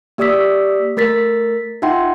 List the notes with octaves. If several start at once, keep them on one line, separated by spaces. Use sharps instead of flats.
A#3 G4 D5 D#6 E6 B6
A3 A#4 A6 B6
D#4 F4 E5 F#5 G5 C6